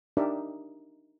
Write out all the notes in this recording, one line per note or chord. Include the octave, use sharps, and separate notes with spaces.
D4 D#4 G4 A#4 D5 E5